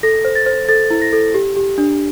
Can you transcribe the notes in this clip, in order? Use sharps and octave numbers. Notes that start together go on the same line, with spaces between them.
A4 A#6
C5
A6
C5
A4 A6
E4
A#6
A4
G4
G4
D4